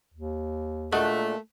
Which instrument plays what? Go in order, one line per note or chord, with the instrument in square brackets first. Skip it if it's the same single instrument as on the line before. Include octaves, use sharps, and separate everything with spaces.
[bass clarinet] D#2
[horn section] A#2 A3 [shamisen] G#3 D4 F#4